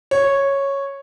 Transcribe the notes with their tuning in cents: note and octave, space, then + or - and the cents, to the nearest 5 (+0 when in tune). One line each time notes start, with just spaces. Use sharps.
C#5 -5